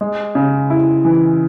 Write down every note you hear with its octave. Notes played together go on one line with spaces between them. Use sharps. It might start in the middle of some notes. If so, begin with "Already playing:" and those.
G#3
C#3
E4
E3